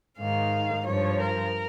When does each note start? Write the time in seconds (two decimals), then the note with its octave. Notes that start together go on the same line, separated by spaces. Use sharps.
0.18 G#2 D#3 F5
0.86 G2 F3 C#5
1.19 A#4